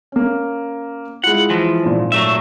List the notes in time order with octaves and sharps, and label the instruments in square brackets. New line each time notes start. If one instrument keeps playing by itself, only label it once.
[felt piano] A#3 C#4
[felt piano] G#3 E4 F4 [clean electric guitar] F#5
[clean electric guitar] E3 F3
[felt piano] G#1 A#2
[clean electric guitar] F#3 A3 E5